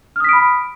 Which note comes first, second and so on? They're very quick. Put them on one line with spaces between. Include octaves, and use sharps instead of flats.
F6 D#6 B6 D7 B5